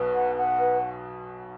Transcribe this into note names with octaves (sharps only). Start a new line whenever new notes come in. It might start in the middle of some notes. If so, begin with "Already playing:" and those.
Already playing: B1 B2 B4
F#5
F#5
B4